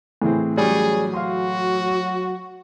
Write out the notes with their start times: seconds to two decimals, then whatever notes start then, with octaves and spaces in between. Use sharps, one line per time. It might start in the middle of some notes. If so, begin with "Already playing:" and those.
0.22 A2 E3 C4 G#4
0.57 F#3 G3 C#4 G#4
1.14 F#4 F5 C6